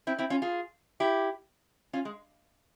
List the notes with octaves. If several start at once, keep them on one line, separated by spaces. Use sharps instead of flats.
C4 E4
C4 E4
C#4 F4
F4 G#4
E4 G4
C#4 F4
G#3